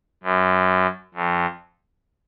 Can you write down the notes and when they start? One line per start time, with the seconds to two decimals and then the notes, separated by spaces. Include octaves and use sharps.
0.23 F#2
1.14 F2